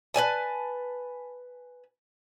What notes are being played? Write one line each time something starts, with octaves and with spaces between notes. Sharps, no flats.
B4 D5 G#5 A5